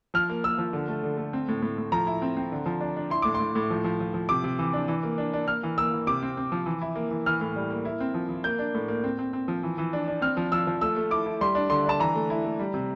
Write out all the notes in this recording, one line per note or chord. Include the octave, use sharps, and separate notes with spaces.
F3 F6
A#3
A#3 E6
F3
D3
A3
D3
A3
C4
A2
A2
A2
F3 A#5
E4
C4
C4
D3
F3
D4
D4
E4 C6
A2 D6
C6
A2
A2
F3
F3
F3
F3
C3 D6
C3
E3
D4
E3
A#3
D4
D4
A#3 F6
E3
A#3 E6
E3
C3 D6
C4
C4
F3
E3
E4
A#3
E3
E3 F6
A2
G3
A#3
E4
C4
F3
F3
A#3 G6
D4
A2
A#3
C4
C4
C4
F3
E3
E3
D4
D4
C4 F6
F3
F3 E6
F3
A3 E6
A3
E4 D6
E4
G3 C6
D4
D3 C6
D4 A5
E3 A#5
A3
E4
A3
G3
C3